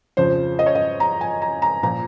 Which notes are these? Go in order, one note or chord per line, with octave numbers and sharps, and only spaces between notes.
F2 C#3 F3 C5
D#5
C#5
D#5
A#5
G#5
A#5
A#5
A#2 F3 A#5